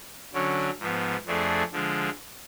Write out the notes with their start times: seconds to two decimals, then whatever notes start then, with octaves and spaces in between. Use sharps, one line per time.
0.33 D3 F#3 C#4
0.80 G#2 F3 B3
1.26 F2 F3 A3 D4 G#4
1.72 D3 F3 G#3